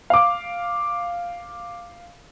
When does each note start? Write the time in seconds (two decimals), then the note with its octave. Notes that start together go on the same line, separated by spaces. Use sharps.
0.10 F5 D6